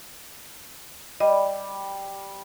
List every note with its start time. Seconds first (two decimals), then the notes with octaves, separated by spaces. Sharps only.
1.20 G3 D#5